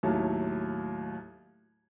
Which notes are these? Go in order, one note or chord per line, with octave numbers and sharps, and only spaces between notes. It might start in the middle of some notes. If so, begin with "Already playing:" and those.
D#2 A2 F#3 A3